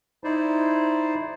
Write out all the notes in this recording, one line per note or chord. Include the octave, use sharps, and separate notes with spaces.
D#4 E4 C5 D5